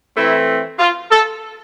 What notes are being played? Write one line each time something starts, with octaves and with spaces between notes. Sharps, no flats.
E3 A3 C4 E4
F4
A4